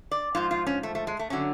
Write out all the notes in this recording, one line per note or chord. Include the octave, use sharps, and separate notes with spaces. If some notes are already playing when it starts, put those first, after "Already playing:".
D5
G#2 F3 F4
F4
C#4
A3
A3
G#3
A3
D3 F#3 C#4